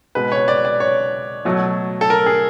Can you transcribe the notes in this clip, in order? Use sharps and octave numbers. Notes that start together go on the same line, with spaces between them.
B2 G#3 B4
C#5
D5
D5
C#5
B2 F#3 A3
A4
A#4
G#4